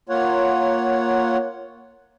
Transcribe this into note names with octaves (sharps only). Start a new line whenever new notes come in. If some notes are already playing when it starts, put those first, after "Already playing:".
A#3 F4 C#5 F#5